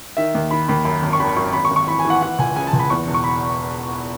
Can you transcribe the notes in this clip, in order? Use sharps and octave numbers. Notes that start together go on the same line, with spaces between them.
D#3 E5
D#2
D#3 B5
D#2 B5
F#2 B5
G#1
C#6
G#1 B5
B5
F#2 C#6
G#1 B5
C#6
G#1
C#6
E3 B5
G#5
E3
F#5
E3 F#5
C#2 G#5
C#3 G#5
A5
C#2
B5
E2 C#6
E1
C#6
B5